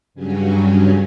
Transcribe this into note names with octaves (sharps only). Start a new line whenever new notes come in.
G2 C#3 F#3 C#4